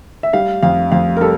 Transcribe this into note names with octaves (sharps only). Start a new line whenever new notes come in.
E5
G3 F5
F2 F5
F2 F5
A#4
G3 A4